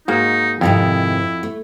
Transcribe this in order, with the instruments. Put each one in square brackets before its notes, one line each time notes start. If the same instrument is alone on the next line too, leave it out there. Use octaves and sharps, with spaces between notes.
[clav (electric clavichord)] G#2 A#3 [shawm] D#4 [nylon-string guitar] F#4
[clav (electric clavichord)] F2 [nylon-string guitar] G#2 C3 D#3 [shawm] E4
[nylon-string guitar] A3